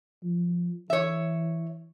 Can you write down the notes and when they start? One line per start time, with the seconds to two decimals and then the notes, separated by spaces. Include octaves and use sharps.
0.23 F3
0.90 E3 C#5 E5